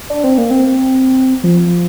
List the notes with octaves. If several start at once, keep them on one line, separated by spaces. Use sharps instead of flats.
D4
C4
A#3
C4
F3